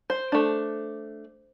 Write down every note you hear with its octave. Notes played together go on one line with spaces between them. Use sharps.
C5
A3 D4